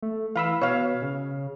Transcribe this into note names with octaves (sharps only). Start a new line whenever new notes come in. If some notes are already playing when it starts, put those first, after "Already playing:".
A3
E3 F5 B5 E6
B2 C#5 F5
C#3